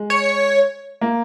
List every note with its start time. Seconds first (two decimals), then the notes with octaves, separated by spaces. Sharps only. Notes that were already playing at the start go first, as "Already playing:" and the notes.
Already playing: G#3
0.10 C#5
1.01 A#3